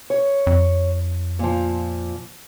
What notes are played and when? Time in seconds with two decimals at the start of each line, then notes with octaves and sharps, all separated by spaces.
0.10 C#5
0.47 F2
1.39 A#2 F3